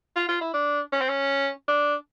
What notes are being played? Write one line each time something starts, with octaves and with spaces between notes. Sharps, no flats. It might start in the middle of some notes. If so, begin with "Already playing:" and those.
F4
F4
E4
D4
C#4
C4
C#4
D4